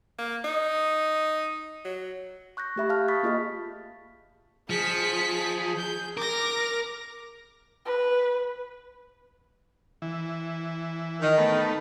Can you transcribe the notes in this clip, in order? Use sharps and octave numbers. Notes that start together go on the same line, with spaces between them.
A#3
D#4
F#3
C#6 F#6 G6 A#6
A3 G4 E5 B5
F5 A5 F6
B5 C#6 D#6 A6 B6
A#3 F4 G#4 D#5 F6
F3 G#4 B6 C#7
G6
A#4 D6 A#6
B4
E3
D#3
A3 B3